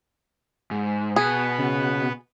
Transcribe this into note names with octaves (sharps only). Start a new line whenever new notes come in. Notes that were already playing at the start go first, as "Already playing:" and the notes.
G#2
B2 B3 G#4 B4
C#3